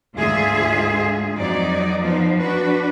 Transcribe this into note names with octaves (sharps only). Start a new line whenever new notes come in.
D2 G#2 D3 F4 G#4 E5
F2 F#3 D#4 D5
F3 B3 D#4
D4 F#4 B4